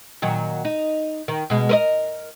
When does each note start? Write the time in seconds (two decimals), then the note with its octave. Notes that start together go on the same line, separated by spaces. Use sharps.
0.22 A#2 D#3 F#3
0.65 D#4
1.28 D#3
1.50 B2 G#3
1.69 A#4 B4 D#5